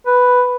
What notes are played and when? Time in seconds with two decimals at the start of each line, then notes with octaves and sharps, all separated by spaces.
0.07 B4